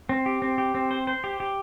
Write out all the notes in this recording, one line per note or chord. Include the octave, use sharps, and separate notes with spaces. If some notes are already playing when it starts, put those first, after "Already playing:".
C4
G4
C4
G4
C4
C5
C5
G4
G4